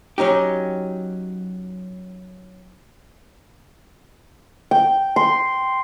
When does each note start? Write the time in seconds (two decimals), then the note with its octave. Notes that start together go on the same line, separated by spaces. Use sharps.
0.18 F#3 C#4 D#4 G4
4.71 G5
5.16 C6